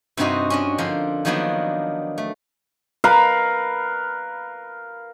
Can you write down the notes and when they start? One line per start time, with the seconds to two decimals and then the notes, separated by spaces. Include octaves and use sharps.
0.17 G2 C3 C4 D#4 F#4 D#5
0.50 C#4 D4 D#5
0.78 D3 F3 A#4 C6
1.25 D#3 F3 F#3 A#3 B3 D4
2.18 A3
3.04 A#4 B4 F5